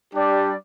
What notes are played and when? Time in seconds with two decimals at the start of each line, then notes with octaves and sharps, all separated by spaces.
0.13 G3 D4 G4 D5